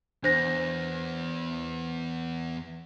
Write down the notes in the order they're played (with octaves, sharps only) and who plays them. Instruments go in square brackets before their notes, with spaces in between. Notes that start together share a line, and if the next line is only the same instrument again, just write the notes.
[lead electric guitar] E2 [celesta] D4 C5 A#6